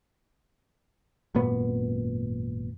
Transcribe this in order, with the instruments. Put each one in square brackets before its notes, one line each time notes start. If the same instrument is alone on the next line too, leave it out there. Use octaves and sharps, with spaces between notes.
[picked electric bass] G#1 F#2 A#2 B3